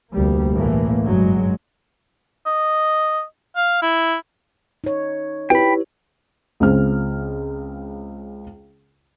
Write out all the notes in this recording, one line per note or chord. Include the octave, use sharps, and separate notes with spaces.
F1 D2 G3 A#3
B1 A2 E3 A3 A#3
F#1 G2 F#3 G#3
D#5
F5
E4
D#4 C#5
E4 G4 B4 G5 B5
C#2 C#3 C4 F6